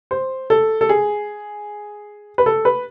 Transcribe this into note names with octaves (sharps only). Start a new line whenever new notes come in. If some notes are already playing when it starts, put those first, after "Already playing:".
C5
A4
A4
G#4
B4
A4
B4